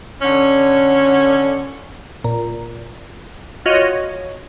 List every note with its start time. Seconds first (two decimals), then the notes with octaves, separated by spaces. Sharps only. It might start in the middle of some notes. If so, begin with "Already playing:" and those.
0.22 D3 C#4
2.24 A#2
3.66 F4 F#4 C#5 D#5